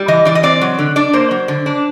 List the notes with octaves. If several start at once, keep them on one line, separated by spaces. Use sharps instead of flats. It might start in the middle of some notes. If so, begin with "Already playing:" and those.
Already playing: G3
E3 D#5
E3 D5
D#5
C4 D5
F#3
D3
D4 D5
A#3 C5
F#3
D3
D4